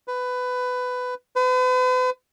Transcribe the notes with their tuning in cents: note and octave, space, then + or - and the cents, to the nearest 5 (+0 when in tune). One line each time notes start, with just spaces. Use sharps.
B4 +15
B4 +45